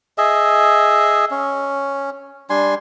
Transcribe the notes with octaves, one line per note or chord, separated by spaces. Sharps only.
G#4 D#5 E5
C#4
G3 D4 G#5 C6